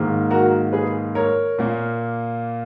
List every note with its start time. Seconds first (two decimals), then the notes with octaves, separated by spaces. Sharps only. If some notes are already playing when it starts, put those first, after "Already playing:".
Already playing: G#2 D#3 A#3
0.31 F#4 A#4
0.73 G#4 B4
1.15 A#4 C#5
1.59 A#2 A#3